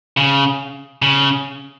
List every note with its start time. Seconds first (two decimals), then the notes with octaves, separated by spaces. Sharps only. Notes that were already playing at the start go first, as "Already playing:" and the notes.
0.17 C#3
1.02 C#3